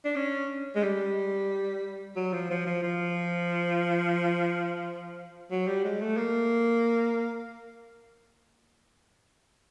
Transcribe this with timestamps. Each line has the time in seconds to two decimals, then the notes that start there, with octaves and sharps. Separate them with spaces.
0.05 D4
0.16 C#4
0.75 G#3
0.83 G3
2.16 F#3
2.33 F3
2.50 F3
2.66 F3
2.83 F3
5.51 F#3
5.67 G3
5.84 G#3
6.01 A3
6.17 A#3